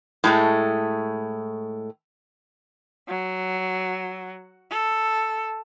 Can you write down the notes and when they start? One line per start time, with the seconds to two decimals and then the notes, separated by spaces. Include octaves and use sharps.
0.24 A2 G#3 A3
3.09 F#3
4.71 A4